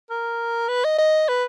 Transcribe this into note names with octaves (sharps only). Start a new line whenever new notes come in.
A#4
B4
D#5
D#5
B4